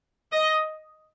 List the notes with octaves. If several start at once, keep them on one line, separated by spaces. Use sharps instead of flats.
D#5